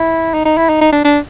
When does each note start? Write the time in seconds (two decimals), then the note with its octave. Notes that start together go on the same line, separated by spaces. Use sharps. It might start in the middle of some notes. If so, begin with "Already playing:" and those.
Already playing: E4
0.34 D#4
0.45 D#4
0.58 E4
0.69 D#4
0.81 D#4
0.92 D4
1.05 D4